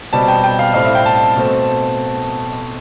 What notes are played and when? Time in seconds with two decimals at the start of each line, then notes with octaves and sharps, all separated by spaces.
0.13 B2 G3 C4 A5
0.28 G5
0.44 G5
0.59 F5
0.74 A2 G3 C4 F5
0.85 E5
0.95 G5
1.06 A5
1.36 B2 A3 C4